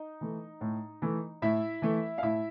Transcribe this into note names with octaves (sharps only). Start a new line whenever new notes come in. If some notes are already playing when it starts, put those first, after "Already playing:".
Already playing: D#4 D#5
E3 A3
A2
E3 A3
A2 E4 E5
E3 A3
F5
A2 E4 E5